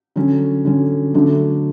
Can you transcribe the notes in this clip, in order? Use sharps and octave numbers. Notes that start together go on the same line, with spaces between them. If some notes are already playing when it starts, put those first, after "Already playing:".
D3 F#3 C#4
D3 F#3 C#4
D3 F#3 A3 D4